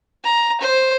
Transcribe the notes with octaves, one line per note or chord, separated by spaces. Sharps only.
A#5
C5